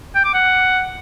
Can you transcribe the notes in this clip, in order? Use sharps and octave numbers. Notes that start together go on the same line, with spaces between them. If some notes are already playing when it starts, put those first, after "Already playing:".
G5
D6
F#5